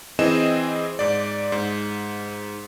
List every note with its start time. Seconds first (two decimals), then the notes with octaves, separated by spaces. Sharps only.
0.19 E3 C4 G#4 D#5 E7
0.99 G#2 D5
1.52 G#2